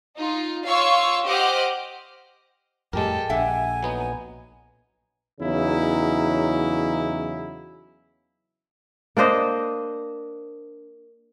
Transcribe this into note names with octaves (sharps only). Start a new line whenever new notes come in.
D#4 F4
F4 C#5 F5 C#6 E6
G4 C5 D#5 F#5 D6 F6
F2 A2 G3 G#3 G4 A4 A#4
A#1 D3 E5 F#5 G#5
F#3 B3 D#4
E2 C#3 F#3 D#4 E4
A#3 D4 C5 D#5